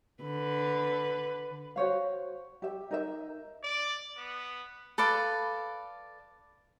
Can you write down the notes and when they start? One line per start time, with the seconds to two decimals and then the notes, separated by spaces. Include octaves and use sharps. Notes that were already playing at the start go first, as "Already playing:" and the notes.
0.22 D3 B4
1.76 F#4 C5 C#5 F5
2.62 G4 E5
2.91 D#4 A#4 E5
3.63 D5
4.17 B3
4.98 A4 B4 D5 F5